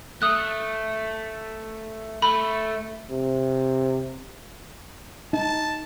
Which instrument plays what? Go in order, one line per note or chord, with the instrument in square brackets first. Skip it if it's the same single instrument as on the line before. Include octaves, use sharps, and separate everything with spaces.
[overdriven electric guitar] A3 [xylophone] D#6 F#6
[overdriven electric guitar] A3 [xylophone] B5
[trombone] C3
[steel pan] D#4 [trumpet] A5